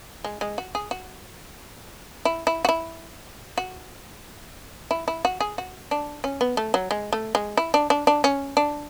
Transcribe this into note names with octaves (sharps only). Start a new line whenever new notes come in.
G#3
G#3
F#4
G#4
F#4
E4
E4
F#4
E4
F#4
E4
E4
F#4
G#4
F#4
D4
C#4
B3
A3
F#3
G#3
A3
G#3
E4
D4
D4
D4
C#4
D4